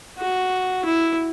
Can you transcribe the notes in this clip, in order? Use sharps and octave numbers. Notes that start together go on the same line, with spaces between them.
F#4
E4